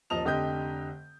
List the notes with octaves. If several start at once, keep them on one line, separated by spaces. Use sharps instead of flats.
D#1 F3 D#5 A5 F7
F1 D3 G4 D#5 G5 G6